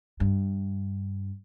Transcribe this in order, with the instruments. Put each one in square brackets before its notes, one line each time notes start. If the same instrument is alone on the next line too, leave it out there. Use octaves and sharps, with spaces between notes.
[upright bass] G2